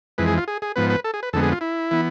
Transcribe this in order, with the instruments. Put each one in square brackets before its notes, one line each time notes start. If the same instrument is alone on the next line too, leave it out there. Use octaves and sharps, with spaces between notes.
[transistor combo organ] F2 E3 G#3 B4
G#4
F4
G#4
G#4
G#2 F3 B3 B4
B4
A4
G#4
B4
F2 D3 G#3 B3 A4
G#4
F4
E4
E3 B3